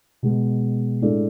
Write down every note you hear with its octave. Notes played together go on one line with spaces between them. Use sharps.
B2 G#3 B3
A2 G#3 D4 A4